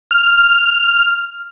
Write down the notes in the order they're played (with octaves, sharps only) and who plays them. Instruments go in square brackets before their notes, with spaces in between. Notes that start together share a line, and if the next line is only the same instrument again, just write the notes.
[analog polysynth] F6